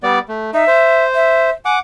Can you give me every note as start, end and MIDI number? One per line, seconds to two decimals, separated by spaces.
0.03 0.19 55
0.03 0.19 59
0.03 0.19 74
0.28 0.51 57
0.54 0.64 63
0.54 1.04 76
0.67 1.50 72
1.15 1.51 76
1.65 1.79 78
1.65 1.76 80
1.65 1.79 86